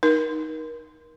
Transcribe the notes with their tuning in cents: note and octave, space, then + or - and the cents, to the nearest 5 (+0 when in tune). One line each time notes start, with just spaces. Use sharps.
D#4 +5 A#4 +30